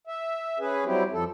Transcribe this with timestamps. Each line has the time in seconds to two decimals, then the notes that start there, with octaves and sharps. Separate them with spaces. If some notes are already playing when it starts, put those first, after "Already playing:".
0.07 E5
0.59 C#4 G#4 B4
0.85 F#3 G3 C4 E4 G4
1.12 F2 F3 A4